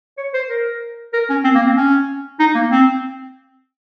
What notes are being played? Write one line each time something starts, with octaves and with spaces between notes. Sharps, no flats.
C#5
C5
A#4
A#4
C#4
C4
A#3
C4
C#4
D#4
A#3
C4